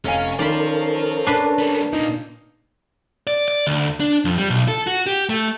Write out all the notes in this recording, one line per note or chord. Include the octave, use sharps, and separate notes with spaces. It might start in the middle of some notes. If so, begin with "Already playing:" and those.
F1 C#4 F5 G#5
D#3 C#4 A4 A#4 C5 D5 F5 B5
D4 B4 C7
G3 B3
A#2 A#3 D#4
D5
D5
D2
D4
F2
G3
B1
A4
F#4
G4
A3